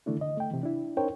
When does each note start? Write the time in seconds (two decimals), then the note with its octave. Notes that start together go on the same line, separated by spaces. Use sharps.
0.06 D3 D#3 A3 D4 E4
0.21 D3 D#5
0.37 A3 G5
0.51 C3 E3
0.63 D4 E4
0.97 C#4 D#4 A#4 C5 C#5 G5